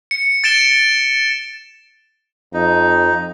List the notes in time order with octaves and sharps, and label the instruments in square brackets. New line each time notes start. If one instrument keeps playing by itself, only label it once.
[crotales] C#7
A6 D7 E7 G7
[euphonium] F2 [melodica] D#4